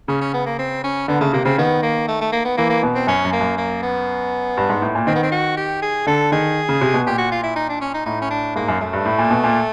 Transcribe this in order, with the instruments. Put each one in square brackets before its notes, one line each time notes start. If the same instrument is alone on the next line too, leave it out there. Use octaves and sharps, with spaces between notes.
[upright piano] C#3 [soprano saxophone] C#4
[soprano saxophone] C#4
B3
A#3
C4
C#4
[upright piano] D3 [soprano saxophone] B3
[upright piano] C#3 [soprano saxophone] A3
[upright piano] C3 [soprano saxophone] A#3
[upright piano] C#3 [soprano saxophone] C4
[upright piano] D#3 [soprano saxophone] B3
[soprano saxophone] A#3
A3
A3
A#3
B3
[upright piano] E3 [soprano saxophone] A#3
[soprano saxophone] A#3
[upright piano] B2
[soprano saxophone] C4
[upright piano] F#2 [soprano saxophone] C#4
[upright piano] F#2
[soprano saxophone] A#3
[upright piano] F#2
[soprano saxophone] A#3
B3
[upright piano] G2
G#2
A2
A#2
[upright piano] D#3 [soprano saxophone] C4
[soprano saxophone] B3
C4
F#4
G4
G#4
[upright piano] D3 [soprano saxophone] A4
[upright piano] D#3 [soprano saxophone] G#4
[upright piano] C#3
C3
B2
[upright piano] A#2 [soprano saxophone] G4
[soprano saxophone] F#4
F4
E4
D#4
D4
C#4
D#4
[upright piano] A2 [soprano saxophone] D#4
[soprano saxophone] C#4
D4
[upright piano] G#2 [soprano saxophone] A#3
[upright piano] F#2
[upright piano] F#2 [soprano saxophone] A3
[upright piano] G2
A2
A#2
B2
A#2